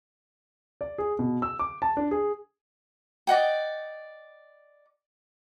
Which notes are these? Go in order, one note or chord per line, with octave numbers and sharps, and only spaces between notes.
D5
G#4
B2
E6
D6
A5
D4
G#4
D5 D#5 F#5 G5